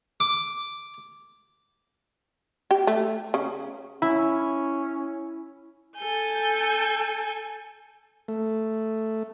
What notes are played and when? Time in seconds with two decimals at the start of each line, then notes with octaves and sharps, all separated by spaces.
0.20 D6
2.71 G4
2.87 A3
3.34 C#3
4.02 C#4 E4
5.98 A4 G#5 G6
8.28 A3